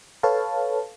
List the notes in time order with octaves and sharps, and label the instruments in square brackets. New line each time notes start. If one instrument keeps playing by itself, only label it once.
[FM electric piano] A4 B4 C#5 F5 A5